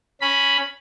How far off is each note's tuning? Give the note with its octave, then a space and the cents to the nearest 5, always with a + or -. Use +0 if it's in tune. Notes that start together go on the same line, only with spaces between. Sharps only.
C#4 +0 B5 +0